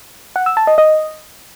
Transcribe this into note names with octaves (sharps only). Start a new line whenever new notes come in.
F#5
E6
A5
D#5
D#5